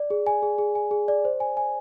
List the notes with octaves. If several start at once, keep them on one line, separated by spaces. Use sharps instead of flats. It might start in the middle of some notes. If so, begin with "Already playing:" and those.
Already playing: D5
G#4
G#5
G#4
G#4
G#5
G#4
D5
C5
G#5
G#5